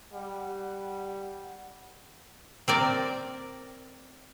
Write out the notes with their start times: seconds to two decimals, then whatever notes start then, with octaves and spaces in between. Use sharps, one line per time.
0.13 G3 F#5
2.68 C4 A#4 D5